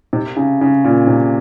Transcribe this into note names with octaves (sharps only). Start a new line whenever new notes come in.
C3
C#3
C#3
A#2
C3